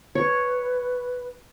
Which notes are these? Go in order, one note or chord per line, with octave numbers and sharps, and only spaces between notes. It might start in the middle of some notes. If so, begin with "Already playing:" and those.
B4 C#5